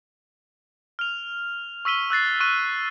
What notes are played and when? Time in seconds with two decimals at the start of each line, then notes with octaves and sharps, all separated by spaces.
0.99 F6 F7
1.85 C#6 E6 B6 D#7 G7
2.10 E6 F#6 A6 C7
2.40 C#6 F#6 D#7